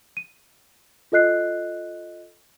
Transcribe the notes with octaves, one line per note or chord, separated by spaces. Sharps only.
D#7
F4 A4 D#5 F#6 C7